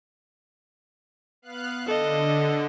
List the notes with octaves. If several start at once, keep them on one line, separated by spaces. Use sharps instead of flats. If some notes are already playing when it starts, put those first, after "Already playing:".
B3 F5 F#6
D3 A4 D#5